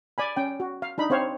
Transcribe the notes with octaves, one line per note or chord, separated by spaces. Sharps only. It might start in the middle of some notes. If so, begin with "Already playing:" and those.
D5 G#5 B5
C#4 G5
F#4
F5
D4 D#4 B5
C4 C5 C#5 F5